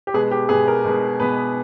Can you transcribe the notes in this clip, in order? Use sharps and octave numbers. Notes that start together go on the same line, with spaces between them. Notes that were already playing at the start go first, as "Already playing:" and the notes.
G4
B2 G#3 B3 G#4
G4
B2 G#3 B3 G#4
A#4
B2 G#3 B3
B2 G#3 B3 B4